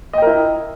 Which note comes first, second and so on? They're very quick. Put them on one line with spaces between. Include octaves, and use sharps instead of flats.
D#5 G5 A#4 E4